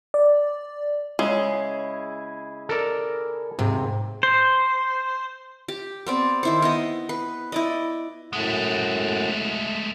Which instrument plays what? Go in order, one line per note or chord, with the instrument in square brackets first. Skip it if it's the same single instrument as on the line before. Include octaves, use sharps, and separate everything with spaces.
[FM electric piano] D5
[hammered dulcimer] C#3 E4 G#4 [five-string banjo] G#3
[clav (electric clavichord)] A4 A#4 D5
[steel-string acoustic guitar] D#2 G#2 [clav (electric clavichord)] C3
[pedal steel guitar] C5
[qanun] G4
B3 C4 D5
D#3 E4 C5
B3 E4 D#5
B4
E4 D5 D#5
[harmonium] F#2 A2 F#5 [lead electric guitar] G#3 A3